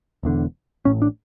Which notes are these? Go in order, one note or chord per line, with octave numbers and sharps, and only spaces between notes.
E1 E2 D3
A1 A2 C#4
D4